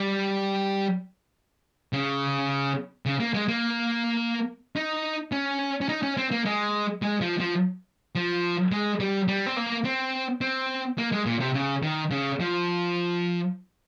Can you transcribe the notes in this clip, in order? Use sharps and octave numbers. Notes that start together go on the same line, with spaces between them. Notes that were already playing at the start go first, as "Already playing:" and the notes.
Already playing: G3
C#3
C#3
A#3
G#3
A#3
D#4
C#4
C#4
D#4
C#4
C4
A#3
G#3
G#3
F3
F3
F3
G#3
G3
G3
C4
A#3
C4
C4
A#3
G#3
A#2
C3
C#3
D#3
C#3
F3